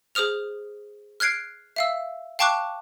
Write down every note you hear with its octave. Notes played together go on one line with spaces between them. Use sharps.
G#4 C5 D#6 F6 F7
F6 F#6 G#6 C7 D7
E5 F5 E6
F5 G5 A5 C#6 D6 F#6